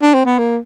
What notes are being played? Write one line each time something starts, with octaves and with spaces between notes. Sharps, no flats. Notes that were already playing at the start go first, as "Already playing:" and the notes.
D4
C4
B3
A#3